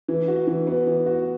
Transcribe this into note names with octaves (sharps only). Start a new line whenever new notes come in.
E3
F#4
E3
B3
E3
F#4